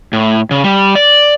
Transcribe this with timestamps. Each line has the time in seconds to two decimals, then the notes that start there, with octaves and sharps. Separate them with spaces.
0.13 A2
0.51 C#3
0.64 G3
0.95 D5